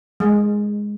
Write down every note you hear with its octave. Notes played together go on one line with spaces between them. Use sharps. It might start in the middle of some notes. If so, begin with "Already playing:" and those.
G#3